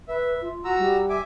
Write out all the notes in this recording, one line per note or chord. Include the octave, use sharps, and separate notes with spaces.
B4 E5
F4
F#4 A#5 E6
G3
E5 G#5 D6